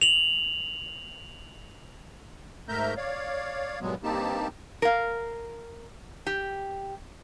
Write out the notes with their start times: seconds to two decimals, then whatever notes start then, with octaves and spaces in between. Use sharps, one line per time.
0.02 F7 F#7
2.69 G#2 A3 A#4 E5 A#5 G6
2.97 C#5 D5 F5
3.81 G2 A#2 F#3 G#3 B3
4.03 G2 A#3 C4 D#4 G4 A5
4.82 A#4 F5
6.27 G4